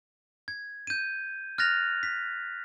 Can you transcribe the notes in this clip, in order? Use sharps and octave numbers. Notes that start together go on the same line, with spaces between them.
G#6
G6 D#7
F6 F#6 A6 A#6 F7
B6